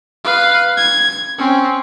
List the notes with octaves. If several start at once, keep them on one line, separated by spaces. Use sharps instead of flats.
B4 F5
G#6
C4 C#4